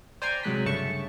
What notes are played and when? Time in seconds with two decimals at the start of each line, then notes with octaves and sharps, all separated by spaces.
0.22 C5 D5 G5 G#5 A#5 C6
0.43 C3 F#3 G#3 F#6 B6
0.66 G2 C#3 A3 A5 C#6